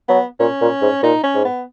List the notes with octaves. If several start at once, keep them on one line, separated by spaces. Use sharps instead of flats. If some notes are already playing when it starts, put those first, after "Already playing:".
F#3 B3
A#2 C#4
A#2
G#2
A#2 D#4
C#4
G#2
B3